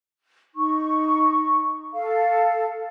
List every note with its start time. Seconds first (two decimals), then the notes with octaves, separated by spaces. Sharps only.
0.55 D#4 C#6
1.94 A4 F5